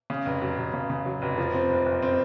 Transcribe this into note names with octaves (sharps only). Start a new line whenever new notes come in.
C#3
F1
F#3
F1
C#3
C#3
F#3
F1
F3
C4
F#1
F#1
C4